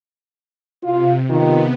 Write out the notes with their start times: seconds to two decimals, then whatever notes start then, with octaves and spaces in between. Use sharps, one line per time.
0.83 C3 F4
1.30 C3 D#3 B3 F4